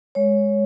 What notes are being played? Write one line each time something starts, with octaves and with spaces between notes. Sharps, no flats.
G#3 C#5